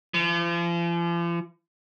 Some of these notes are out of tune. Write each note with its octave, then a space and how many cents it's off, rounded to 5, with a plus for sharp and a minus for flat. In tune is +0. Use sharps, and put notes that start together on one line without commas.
F3 -40